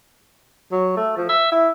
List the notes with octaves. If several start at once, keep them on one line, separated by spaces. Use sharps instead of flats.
F#3
A3
F3
E5
E4